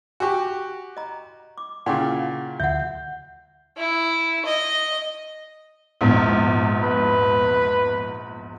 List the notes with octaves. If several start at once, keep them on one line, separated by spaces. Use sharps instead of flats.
F#4 G4 G#5 C#6
D#5 A#5
D6
A#2 C#3 E4 F#5 G5 D6
D2 E5 F#5 G6
E4
D#5
A#1 E2 G#2
B4